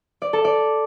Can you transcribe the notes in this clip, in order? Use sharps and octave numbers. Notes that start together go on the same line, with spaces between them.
D5
A4
D5